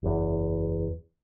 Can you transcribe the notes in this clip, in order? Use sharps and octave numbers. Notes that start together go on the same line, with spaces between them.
F#1 E2